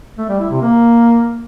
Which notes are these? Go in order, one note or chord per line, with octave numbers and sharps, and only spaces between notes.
A3
G3
E4
C3
A#3